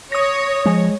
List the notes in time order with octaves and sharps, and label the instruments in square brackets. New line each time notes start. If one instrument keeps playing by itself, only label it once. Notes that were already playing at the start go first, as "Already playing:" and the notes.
[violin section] C#5 [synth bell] D#6 A#6
[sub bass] F3 [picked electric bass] G#3